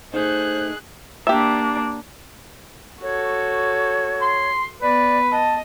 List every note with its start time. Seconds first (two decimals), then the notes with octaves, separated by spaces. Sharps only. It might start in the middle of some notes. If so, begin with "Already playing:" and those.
0.13 A3 D#4 G#4 C5 F#6
1.27 A#3 D4 G4 E5
3.02 F#4 A4 C#5
4.22 C6
4.82 B3 B4 D5
5.31 D#5 A5